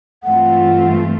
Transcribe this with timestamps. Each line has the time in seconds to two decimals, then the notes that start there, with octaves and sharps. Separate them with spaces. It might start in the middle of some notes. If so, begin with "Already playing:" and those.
0.24 G2 E3 A3 C4 F4 F#5